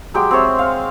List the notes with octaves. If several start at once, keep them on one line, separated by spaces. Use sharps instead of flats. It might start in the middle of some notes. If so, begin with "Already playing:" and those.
F#3 G#3 G4 G5
C4 G#4 C#5 E5
F5